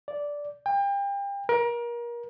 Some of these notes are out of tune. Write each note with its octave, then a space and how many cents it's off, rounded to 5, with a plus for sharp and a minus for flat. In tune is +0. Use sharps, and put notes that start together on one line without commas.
D5 -10
G5 +35
A#4 +30